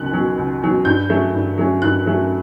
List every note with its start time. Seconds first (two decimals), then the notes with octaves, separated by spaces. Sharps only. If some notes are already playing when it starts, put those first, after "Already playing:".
Already playing: C#2 B2 F#3 C#4 F#6
0.13 B2 F#3 C#4
0.38 C#2
0.62 B2 F#3 C#4
0.85 G2 G6
1.09 F#3 A3 C#4
1.34 G2
1.58 F#3 A3 C#4
1.82 G2 F#6
2.06 F#3 A3 C#4